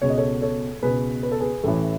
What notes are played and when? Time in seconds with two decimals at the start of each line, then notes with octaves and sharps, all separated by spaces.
0.01 C#2 B2 C#5
0.10 D#5
0.18 A4 C#5
0.42 A4 C#5
0.83 C#2 B2 G#4 B4
1.23 B4
1.32 A4
1.40 G#4 B4
1.64 A1 A2 E3 A4